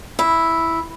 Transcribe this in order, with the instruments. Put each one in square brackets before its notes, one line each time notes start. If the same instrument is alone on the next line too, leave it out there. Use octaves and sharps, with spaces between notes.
[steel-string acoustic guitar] E4